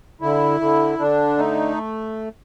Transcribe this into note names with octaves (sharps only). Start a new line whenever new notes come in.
D3 E4
D3
D3 D4
A3 D#4